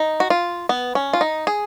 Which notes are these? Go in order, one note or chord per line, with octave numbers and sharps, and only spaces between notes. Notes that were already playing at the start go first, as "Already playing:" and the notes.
Already playing: D#4
F#4
F4
B3
C#4
F4
D#4
G#4